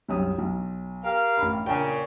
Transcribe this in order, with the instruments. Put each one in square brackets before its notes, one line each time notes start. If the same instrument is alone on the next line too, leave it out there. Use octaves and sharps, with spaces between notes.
[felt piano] C2 F#2 D#6
B1
[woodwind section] G4 A#4 F5
[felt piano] A1 B5
[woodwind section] A#2 C#3 [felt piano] G5 G#5